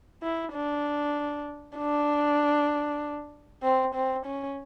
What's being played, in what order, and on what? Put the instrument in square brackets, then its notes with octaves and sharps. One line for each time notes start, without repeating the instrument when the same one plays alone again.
[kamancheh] E4
D4
D4
C4
C4
C#4